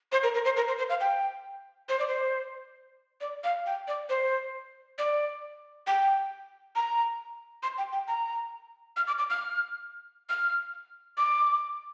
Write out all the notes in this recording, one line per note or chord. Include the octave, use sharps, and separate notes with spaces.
C5
A#4
A#4
C5
A#4
C5
C5
F5
G5
C5
D5
C5
D5
F5
G5
D5
C5
D5
G5
A#5
C6
G5
G5
A#5
F6
D6
D6
F6
F6
D6